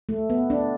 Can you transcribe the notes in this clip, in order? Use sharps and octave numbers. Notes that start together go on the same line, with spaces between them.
A3
B3
D4